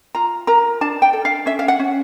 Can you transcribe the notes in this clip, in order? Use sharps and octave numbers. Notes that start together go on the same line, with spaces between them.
F4 A#5
A#4 A#5
D4 A5
G5
A4
F5
C#4 E5
F5
F#5
C#4